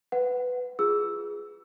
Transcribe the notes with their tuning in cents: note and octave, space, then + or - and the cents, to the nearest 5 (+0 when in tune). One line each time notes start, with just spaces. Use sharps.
B4 +10 F#5 +0
F4 +0 G#4 +0 E6 +0